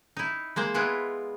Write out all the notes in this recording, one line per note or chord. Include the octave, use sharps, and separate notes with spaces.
D#4 E4
G#3 A#3 C5
G#3 B3 E4 F4